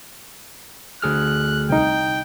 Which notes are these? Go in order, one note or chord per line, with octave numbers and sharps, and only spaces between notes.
D2 G#4 F6 F#6
C2 D#4 G5